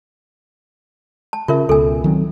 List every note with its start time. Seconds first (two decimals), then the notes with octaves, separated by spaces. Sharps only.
1.33 A5
1.48 C#3 F4 A#4 E5
1.69 C#2 B2 A4 G#5
2.04 D#3 F#3 C4